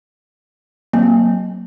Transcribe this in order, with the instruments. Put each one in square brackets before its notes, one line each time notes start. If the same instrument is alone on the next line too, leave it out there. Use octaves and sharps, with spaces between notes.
[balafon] F#3 A#3 C4